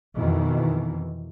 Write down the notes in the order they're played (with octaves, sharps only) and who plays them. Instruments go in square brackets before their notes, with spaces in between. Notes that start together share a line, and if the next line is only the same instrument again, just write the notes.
[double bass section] F2 B2 D#3 E3